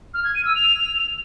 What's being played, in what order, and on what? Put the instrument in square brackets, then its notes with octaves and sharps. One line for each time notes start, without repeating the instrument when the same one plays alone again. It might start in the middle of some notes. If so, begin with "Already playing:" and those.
[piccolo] F6
G#6
D#7
E6
F7